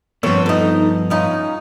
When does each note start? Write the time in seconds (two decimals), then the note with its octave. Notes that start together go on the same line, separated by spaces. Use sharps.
0.23 G2 F3 B3 C4 A4 C#5
0.46 D#4 A4
1.10 C#4 D#4 F4